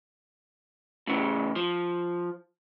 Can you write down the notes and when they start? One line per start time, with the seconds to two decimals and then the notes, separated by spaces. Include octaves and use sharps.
1.07 A2 C#3 E3
1.56 F3